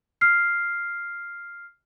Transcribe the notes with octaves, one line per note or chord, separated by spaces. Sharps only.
F6 C7